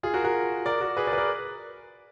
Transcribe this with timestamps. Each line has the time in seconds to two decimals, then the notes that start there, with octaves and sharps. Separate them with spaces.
0.03 F4 G#4
0.14 F#4 A#4
0.24 F#4 A#4
0.66 A#4 D5
0.81 F#4 A#4
0.97 G#4 B4
1.07 A#4 D5
1.13 B4
1.17 A#4 D5